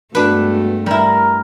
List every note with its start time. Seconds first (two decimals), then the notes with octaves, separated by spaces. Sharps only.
0.15 G2 G#3 A3 B3 D4 F#4 B4
0.86 G3 E4 A#4